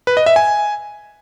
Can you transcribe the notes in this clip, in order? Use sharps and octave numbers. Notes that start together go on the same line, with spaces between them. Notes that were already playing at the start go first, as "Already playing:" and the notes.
B4
D#5
E5
G#5